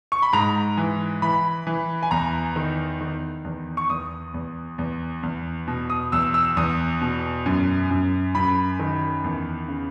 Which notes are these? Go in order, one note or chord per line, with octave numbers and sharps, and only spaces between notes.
C#6
B5
G#2 A#5
E3
E3 B5
E3
G#5
E2 A#5
D#3
D#3
E2
C#6
E2 D#6
E2
E2
E2
B2
D#6
E2 E6
E6
E2 D#6
B2
F#2
F#2
F#2 B5
D#3
E2
C#3